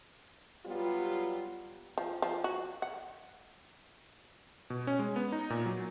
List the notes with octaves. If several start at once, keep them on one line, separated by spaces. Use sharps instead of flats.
F#3 G3 B3 F4 G4
F3
F3
F#4
F#5
B2
C#4
G#3
B3
D#4
A#2
F#3